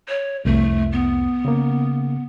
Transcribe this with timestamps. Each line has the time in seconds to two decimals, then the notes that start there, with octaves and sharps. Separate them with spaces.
0.08 C#5
0.45 C2 F2 A3
0.92 B3
1.45 C#3 A#3